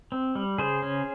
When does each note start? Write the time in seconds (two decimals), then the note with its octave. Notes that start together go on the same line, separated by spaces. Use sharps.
0.12 C4
0.35 G3
0.58 C#3 G#4 C5
0.82 C#4